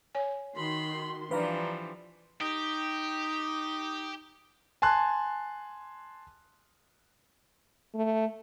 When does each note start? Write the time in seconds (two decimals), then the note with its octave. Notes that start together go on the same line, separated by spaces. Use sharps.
0.15 C#5 G#5
0.56 D#3 F#4 B5 C6
1.31 E3 F3 G3 D4 B4 F5 A#5
2.41 D#4 G4
4.82 G#5 A5 C6 F#6
7.95 A3